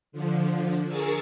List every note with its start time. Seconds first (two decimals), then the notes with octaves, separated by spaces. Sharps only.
0.12 D3 F3
0.88 G#4 A#4 C#6 E6 A6 C#7